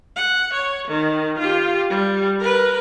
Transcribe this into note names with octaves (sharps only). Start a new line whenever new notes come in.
F#5
C#5
D#3
F4 G4
G3
A#4 B4